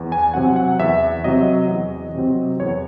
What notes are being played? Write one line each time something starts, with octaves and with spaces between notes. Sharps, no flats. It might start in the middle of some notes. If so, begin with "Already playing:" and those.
Already playing: E2
G#5
C3 F#3 C4 F#5
F#5
E2 E5
C3 F#3 C4 D#5
E2
C3 F#3 C4
E2 C#5